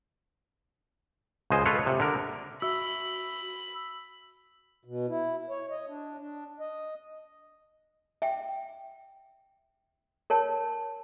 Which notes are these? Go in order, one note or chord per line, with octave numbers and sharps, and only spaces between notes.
C#2 C5 D#5 G#5
F4 A4 B4 C#5
C3
D3 A#4
F#4 E5 B5 E6
B2
E4
C#5
D#5
D4
D4
D#5
E5 G5
A#4 C#5 A5